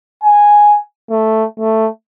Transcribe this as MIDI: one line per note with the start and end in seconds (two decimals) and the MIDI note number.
0.23 0.79 80
1.10 1.45 57
1.59 1.88 57